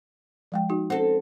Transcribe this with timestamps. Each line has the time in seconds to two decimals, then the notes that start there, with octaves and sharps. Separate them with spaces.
0.52 F3 G#3 G5
0.70 D#4 F#4
0.90 C4 C#4 A4 F#5